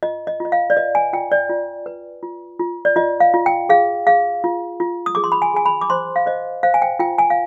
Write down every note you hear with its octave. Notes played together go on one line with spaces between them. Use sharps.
F4 D#5
D#5
F4 D#5
F5
D5
B4 D#5
G#5
F4 G5
D5
F4
B4
F4
F4
D5
F4 D#5
F5
F4
G5
G#4 F5
G#4 F5
F4
F4
D#6
G#4 D6
C6
B5
G#5
G#4 G#5
B5
D6
C5 C6
F5
C5 D#5
C5 F5
G#5
G5
F4 G5
G#5
F5